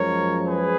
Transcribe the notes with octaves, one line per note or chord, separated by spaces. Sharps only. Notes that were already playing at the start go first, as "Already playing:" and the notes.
Already playing: F#2 F3 G#3 A#4 C#5
G#4 B4